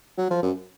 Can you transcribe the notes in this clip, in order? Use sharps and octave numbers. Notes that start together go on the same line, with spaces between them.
F#3
F3
F#2